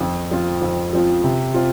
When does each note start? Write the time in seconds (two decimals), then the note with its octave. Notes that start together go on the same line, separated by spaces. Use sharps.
0.01 F2
0.31 F3 C4 F4
0.62 F2
0.93 F3 C4 F4
1.24 C3
1.54 C4 F4